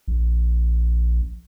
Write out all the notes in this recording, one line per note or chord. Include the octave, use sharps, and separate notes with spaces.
A#1